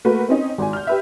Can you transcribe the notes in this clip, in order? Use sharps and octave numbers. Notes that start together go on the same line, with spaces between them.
A3 A#3 F#4 A#4 B4
C4 C#4 D#4
G#1 G#5
F6 G6
G4 B4 E5